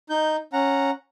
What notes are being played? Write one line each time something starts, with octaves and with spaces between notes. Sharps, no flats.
D#4 G6
C#4 F#5 A#5